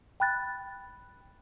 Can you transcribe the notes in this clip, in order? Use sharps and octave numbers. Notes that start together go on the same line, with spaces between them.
G5 B5 F#6 A6